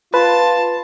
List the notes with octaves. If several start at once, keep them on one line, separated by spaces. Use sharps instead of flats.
F4 B4 A5